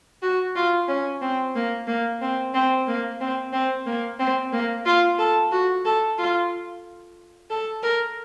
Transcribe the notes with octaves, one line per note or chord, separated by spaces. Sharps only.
F#4
F4
C#4
C4
A#3
A#3
C4
C4
A#3
C4
C4
A#3
C4
A#3
F4
A4
F#4
A4
F4
A4
A#4